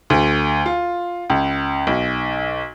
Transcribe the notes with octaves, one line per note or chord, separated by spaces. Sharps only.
D2
F4
C#2
B1